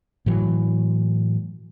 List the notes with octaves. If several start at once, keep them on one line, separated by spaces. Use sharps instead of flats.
A2 E3 F#3